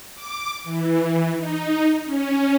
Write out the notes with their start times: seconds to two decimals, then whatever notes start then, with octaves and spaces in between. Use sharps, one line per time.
0.15 D6
0.64 E3
1.36 D#4
2.05 C#4